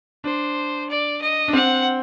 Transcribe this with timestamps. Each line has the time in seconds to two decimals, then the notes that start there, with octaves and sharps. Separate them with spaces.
0.24 D4 C5
0.90 D5
1.21 D#5
1.48 D4
1.53 C4 F#5